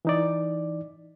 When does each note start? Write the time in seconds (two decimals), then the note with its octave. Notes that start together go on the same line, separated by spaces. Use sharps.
0.05 E3 D#4 D5